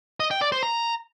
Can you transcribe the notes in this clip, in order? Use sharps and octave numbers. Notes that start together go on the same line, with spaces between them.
D#5
G5
D5
C5
A#5